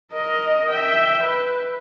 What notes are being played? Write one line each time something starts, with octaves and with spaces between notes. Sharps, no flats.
A#4 D#5
E5 G5
B4